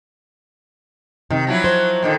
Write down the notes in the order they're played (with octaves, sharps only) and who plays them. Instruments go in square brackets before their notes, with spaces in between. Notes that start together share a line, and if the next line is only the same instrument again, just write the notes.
[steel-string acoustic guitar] C3 [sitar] D#3
[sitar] F3 F#3 E4
[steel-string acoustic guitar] C5
[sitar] A#2 D3 D#3